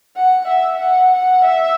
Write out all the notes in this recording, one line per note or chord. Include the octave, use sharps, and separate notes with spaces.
F#5
E5
F#5
F#5
E5